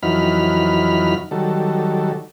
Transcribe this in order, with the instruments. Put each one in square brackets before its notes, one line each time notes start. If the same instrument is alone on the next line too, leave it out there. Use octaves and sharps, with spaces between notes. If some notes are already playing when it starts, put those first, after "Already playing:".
[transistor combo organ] F2 E3 F#3 D#4 B5 F6
D#3 F#3 G3 A4